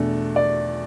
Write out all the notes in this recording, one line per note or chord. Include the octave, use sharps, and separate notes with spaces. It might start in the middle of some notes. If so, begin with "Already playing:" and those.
Already playing: E2 B2 A3 D4
D5